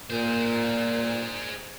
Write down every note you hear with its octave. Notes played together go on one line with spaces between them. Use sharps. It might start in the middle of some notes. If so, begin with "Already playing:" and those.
A#2 G#4 C5